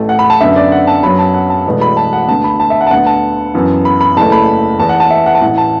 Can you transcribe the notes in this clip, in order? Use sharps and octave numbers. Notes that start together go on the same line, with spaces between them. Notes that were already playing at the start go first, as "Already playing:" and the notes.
Already playing: A1 A2 A3
F#5
B5
A5
F#2 D3 B3 E5
D5
F#5
A5
F#2 F#3 B3 B5
A5
F#5
A5
E1 E2 B2 A3
B5
A5
F#5
D2 D3 B3 A5
B5
A5
E5
F#5
A5
D2 D3 B3 F#5
A5
F#2 E3 B3
B5
B5
F#1 E2 E3 A3 A5
B5
E2 E3 B3 A5
F#5
A5
E5
F#5
A5
A1 A2 E3 F#5
A5